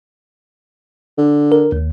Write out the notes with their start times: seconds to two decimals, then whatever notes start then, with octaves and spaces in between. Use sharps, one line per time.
1.18 D3
1.52 A#4
1.72 D#2